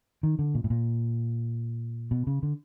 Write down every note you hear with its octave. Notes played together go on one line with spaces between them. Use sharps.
D#3
D3
A#2
A2
A#2
B2
C#3
D3